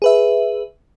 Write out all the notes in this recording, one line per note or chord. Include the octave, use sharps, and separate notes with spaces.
G#4 B4 E5